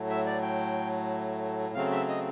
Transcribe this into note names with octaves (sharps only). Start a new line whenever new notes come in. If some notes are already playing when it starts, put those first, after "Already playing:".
Already playing: A2 F#3 A3
E5
D5
G5
C#3 F#3 A3 C4 F5
E5
D#5